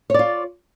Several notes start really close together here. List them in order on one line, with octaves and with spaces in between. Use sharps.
C#5 D5 F4